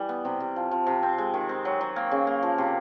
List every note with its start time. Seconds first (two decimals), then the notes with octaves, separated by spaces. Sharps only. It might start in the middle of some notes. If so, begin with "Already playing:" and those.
Already playing: E3 G3
0.09 B3
0.25 C3
0.40 C3
0.56 F3
0.71 F3
0.87 C3
1.03 C4
1.18 G#3
1.34 D#3
1.49 C4
1.65 F#3
1.81 F#3
1.96 A#3
2.11 C#3
2.27 A#3
2.43 F3
2.58 C3